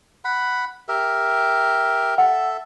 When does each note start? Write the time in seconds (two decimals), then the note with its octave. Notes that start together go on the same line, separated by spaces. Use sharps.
0.25 F#5 B5
0.88 G4 A#4 E5
2.18 A4 E5 F#5